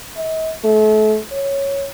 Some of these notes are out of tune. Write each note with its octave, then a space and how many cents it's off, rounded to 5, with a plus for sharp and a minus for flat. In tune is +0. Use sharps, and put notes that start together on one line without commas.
D#5 +45
A3 -35
C#5 +0